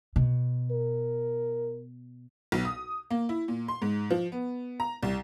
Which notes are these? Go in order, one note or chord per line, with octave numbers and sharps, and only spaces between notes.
B2
A#4
B1
D#6
A#3
E4
A#2
C6
G#2
F3
B3
A#5
C2